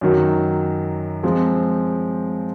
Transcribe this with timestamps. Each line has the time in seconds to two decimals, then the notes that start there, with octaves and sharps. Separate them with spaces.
0.01 F#2 D#3 F#3
1.23 F3 G#3 C4